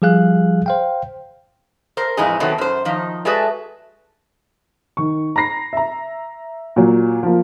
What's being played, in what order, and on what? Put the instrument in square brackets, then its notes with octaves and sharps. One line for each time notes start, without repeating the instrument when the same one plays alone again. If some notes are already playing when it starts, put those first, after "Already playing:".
[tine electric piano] F3 G3 G#4 F5 F#6
C5 F5 G5
[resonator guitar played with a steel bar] A#4 C5
F2 A2 E3 G#3 D#4 G#4
B2 D#3 F#3 A3 B3 C4
F#2 C5
D#3 F3 D#4
G#3 A3 F#4 G#4 B4 D5
[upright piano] D#3 C#6
A#5 B5 A#6 C7
E5 A#5
A#2 F#3
F3 A#3